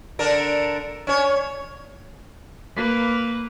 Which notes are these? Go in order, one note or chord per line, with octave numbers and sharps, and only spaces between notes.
D3 D4 A#4
C#4 C#5
A#3 B4